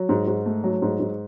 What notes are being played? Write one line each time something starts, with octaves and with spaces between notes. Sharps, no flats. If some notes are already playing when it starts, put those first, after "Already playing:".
Already playing: F#3
G#2
G#2
A3
F#3
G#2
G#2